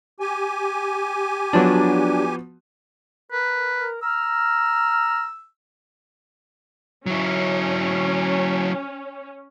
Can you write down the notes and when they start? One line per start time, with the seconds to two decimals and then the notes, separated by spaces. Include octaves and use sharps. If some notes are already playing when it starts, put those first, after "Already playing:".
0.20 G4 G#5
1.53 F3 F#3 B3 D4 F#4
3.32 A#4 B4
4.03 A#5 E6 F6
7.06 F#3 C#4 E4